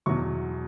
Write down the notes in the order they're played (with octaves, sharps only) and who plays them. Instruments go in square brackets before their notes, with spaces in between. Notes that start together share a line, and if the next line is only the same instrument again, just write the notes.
[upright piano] E2 B2 F#3 C#6